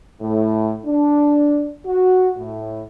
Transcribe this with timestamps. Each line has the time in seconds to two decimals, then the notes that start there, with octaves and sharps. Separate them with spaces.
0.21 A2
0.85 D4
1.86 F#4
2.38 A2